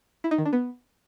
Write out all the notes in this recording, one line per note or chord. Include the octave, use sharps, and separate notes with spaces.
E4
D#4
D#3
D4
B3